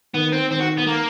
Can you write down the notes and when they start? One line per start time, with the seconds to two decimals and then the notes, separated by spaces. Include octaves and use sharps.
0.14 D#3 B3
0.32 C4
0.51 D#3 C4
0.60 F#4
0.77 B3
0.87 A#3